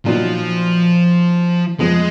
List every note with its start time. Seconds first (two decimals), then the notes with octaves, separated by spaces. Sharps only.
0.06 A#2 F3 F#3 B3 D#4
1.80 F2 F3 G#3 B3 F4 G#4